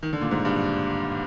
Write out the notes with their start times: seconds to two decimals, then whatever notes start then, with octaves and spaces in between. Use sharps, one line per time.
0.03 D#3
0.13 D3
0.21 A#2
0.31 G#2
0.45 G2